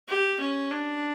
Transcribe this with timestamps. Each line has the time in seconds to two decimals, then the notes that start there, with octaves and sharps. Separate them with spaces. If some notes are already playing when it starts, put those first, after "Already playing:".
0.08 G4
0.39 C#4
0.71 D4